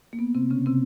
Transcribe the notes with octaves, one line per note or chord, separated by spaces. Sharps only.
A#3
B3
C3 C4
C#3 C#4
C3 C4